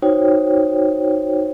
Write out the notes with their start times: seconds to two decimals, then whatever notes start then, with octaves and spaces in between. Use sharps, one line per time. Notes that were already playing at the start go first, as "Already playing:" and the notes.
0.02 D#4 F#4 C5 C#5 G5